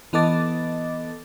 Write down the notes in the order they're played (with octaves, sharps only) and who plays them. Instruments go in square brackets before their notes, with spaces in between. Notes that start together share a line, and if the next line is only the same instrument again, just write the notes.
[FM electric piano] E3 B3 A4 D#5 D6 A6